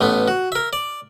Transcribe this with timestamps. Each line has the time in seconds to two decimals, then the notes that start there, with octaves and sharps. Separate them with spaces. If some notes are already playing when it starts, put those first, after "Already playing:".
0.01 A1 A3 B3
0.28 F#4
0.52 A#4 E5
0.73 D5